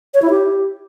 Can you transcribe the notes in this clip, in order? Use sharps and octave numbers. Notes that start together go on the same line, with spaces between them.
C#5
E4
G4